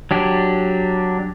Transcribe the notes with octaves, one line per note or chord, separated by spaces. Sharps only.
F#3 D4 G4